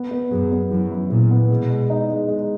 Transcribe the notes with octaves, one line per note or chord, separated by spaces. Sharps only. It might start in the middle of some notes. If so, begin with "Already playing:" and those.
Already playing: B3
B3
F#2 G#4
B3
F#2 E3
E4
A#2 E3
B3
B2 G#3
G#3
D#4
G#3
G#3